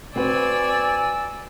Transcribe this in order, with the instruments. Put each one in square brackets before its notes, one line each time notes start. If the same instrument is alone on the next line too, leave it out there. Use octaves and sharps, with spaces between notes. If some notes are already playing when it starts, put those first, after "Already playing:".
[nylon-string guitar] C4 F#4 B4 [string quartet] D5 G#5 E6